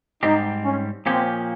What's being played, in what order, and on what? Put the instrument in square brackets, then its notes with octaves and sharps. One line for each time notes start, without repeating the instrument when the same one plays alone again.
[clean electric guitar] G#2 G3 C4 G4 [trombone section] D#4
[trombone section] C#4
[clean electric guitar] A#2 F3 A#3 C#4 G4 [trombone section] C4